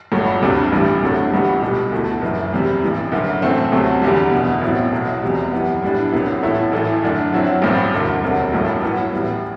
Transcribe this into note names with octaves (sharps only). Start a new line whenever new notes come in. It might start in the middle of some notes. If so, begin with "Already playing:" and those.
G1 G2 F#3 A3
D2 C3 G3 D4
A1 G2 E3 G3
D2 C3 F#3 A3 D4
G1 G2 E3 G3 B3
B1 B2 G3
D2 D3 A3 E4
F#1 F#2 E3
E2 C3 G3
A1 G2 E3
F#1 F#2 D3
A2 E3 A3 C4
D2 C3 F#3 A3
E2 D3 G3
F#1 E2 B2
A1 A2 F#3 C4 E4
B1 B2 F#3
E2 C3 G3
F#2 E3 G3 B3
A2 G3 D4
C2 C3 F#3 B3 E4
A1 A2 F#3 A3 E4
A1 A2 E3 A3
F#2 D3 A3 D4
F#2 F#3 C4 E4
A1 G2 F#3 C4
E1 D2 D3
E1 D2 C3 F#3
A1 G2 F#3 A3 E4
A2 F#3 B3 E4
A1 A2 G3 B3